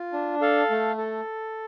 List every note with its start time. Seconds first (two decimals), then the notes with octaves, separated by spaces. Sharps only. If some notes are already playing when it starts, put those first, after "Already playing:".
Already playing: F4
0.13 D4
0.41 A4 F5
0.70 A3
0.98 A4